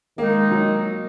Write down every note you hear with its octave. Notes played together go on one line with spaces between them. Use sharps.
D#3 G#3 A#3 D#4
F#3